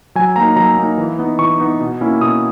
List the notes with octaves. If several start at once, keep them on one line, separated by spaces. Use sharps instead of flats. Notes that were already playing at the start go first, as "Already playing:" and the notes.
F#3 G#5
A#3 D#4 A#5
F#3 A#5
A#3 D#4
E3
B3 D#4
E3 C#6
B3 D#4
B2
A#3 C#4 E4
B2 D#6